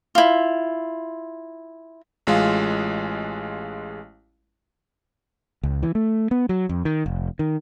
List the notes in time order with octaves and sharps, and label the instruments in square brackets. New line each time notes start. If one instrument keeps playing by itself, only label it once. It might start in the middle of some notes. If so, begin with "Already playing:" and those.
[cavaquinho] E4 F4
[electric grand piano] A1 G#3 F4 F5
[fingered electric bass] C#2
E3
A3
B3
F#3
F2
D#3
F1
D#3